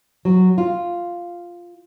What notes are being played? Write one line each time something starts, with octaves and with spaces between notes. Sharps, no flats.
F#3
F4